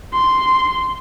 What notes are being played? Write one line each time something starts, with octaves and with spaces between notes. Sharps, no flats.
C6